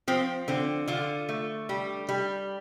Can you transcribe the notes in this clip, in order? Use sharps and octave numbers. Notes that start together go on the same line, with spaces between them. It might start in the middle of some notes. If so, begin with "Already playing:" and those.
F3 C4
D3 C4
D3 F4
A3
G3
G3